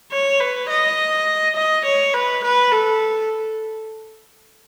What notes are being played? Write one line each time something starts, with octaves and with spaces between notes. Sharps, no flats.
C#5
B4
D#5
D#5
C#5
B4
B4
A4